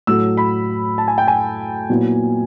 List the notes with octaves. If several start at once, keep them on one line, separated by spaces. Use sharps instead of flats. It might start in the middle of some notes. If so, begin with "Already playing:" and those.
A2 F#3 A3 E6
B5
A5
G#5
G5
G#5
A#2 F#3 B3 E4